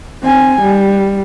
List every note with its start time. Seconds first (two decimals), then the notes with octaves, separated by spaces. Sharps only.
0.23 C4 G#5
0.61 G3